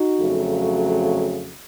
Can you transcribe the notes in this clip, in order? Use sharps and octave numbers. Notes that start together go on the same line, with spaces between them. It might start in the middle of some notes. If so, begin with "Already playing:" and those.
Already playing: D#4 F#4
F2 C#3 F#3 A3